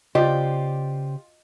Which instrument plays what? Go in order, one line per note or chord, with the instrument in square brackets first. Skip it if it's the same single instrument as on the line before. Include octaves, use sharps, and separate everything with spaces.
[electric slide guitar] C#3 C5 D5 [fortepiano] F4 [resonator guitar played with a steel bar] G4 [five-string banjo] D#5